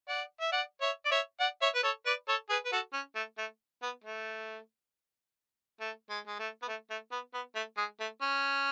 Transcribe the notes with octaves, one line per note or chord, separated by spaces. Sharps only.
D5 F#5
E5
D5 F#5
C#5 E5
D5
C#5 E5
D5 F#5
C#5 E5
B4
A4 C#5
B4 D5
A4 C#5
G#4 B4
B4
F#4 A4
C#4
A3
A3
B3
A3
A3
G#3
G#3
A3
B3
A3
A3
B3
B3
A3
G#3
A3
C#4